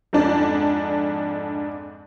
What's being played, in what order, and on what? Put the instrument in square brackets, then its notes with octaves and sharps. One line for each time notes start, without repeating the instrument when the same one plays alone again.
[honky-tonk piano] F2 G#2 D4 D5